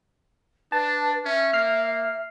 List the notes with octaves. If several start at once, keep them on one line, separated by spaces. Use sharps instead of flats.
D4 B4 A5
C#4 E5
A#3 F6 C7